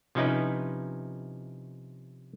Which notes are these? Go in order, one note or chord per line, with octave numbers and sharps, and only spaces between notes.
C3 F3 C#4 D#4 E4 B4